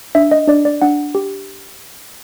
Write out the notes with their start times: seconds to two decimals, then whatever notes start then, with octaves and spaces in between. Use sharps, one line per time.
0.15 D4 E5
0.31 D#5
0.48 D4 D5
0.65 D5
0.82 D4 F#5
1.15 G4